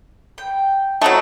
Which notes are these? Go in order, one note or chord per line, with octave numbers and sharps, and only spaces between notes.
G5
F#3 A3 D#4 F#4